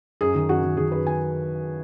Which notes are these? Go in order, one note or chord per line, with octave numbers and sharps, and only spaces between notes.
F#2 G#4
D#3
F#2 F#4
D#3
D#3 G#4
F#2 B4
D#3 G#5